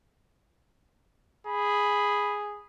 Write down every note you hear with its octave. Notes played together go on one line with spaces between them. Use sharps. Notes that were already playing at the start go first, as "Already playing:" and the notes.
G#4 B5